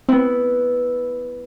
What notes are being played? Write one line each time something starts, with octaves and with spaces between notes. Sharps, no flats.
B3 C4 E4